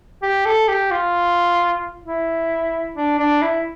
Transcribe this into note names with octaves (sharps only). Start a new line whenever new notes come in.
G4
A4
G4
F4
E4
D4
D4
E4